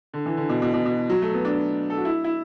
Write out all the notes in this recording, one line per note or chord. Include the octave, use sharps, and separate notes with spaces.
D3
E3
D3
B2
B2
B2
B2
F#3
A3
B3
D4
A4
F#4
E4
E4